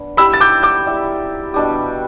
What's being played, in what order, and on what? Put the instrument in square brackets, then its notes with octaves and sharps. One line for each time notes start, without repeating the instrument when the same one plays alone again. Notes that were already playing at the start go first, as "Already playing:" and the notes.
Already playing: [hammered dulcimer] B3 D4
[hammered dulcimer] G3 E4 G4 [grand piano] B5 E6
[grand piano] A6
D6 G6
D6 G6
[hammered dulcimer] G3 E4 G4
B2 G3 D4 G4